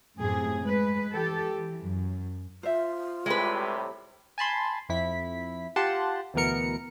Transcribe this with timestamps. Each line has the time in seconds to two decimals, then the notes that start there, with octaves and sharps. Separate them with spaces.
0.18 F#2 A2 C3 G#4
0.61 G#3 B4
1.11 E3 G4 A4
1.50 E3
1.81 F#2
2.63 F4 C5 E5
3.26 A2 C3 G3 G#3 B4
4.38 G#5 A5 B5 C6
4.89 F2 E4 B6
5.76 F4 G4 F#5 A5 C6
6.34 D2 B2 E3 B3 A#4 C#7